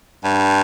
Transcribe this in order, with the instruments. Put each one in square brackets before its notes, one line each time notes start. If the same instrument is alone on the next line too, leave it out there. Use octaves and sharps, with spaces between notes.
[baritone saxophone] G2